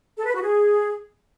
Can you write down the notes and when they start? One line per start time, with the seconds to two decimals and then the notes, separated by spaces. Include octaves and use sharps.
0.16 A4
0.25 B4
0.34 F#4
0.42 G#4